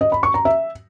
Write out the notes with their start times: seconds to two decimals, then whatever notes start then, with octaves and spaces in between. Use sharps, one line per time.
0.01 D#5
0.12 B5
0.23 C#6
0.34 A#5
0.45 E5